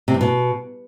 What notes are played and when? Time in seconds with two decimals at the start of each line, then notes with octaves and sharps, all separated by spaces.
0.08 C3
0.14 G2
0.21 B2